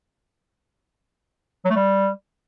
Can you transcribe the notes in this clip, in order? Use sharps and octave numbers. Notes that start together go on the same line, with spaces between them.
F#3
A3
G3